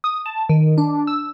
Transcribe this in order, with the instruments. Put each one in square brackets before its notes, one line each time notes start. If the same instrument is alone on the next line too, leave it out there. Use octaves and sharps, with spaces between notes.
[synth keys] D#6
A5
D#3
D4
E6